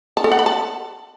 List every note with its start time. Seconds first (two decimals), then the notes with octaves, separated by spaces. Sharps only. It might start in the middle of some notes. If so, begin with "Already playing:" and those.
0.17 A5
0.24 A4
0.31 F#5
0.39 B5
0.46 A5